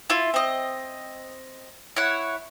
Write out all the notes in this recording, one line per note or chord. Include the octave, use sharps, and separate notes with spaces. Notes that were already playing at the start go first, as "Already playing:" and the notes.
E4 F4
C4 D#5
E4 C#5 F#5